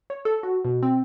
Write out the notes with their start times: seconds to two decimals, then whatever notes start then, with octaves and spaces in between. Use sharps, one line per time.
0.10 C#5
0.25 A4
0.43 F#4
0.65 B2
0.83 C4